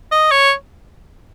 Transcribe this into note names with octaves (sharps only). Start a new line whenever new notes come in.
D#5
C#5